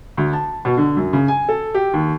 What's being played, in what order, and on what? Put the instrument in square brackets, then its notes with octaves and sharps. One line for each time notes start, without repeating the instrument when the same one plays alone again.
[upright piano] D2
A5
B2
D3
F#2
C#3
G#5
A4
G4
D#2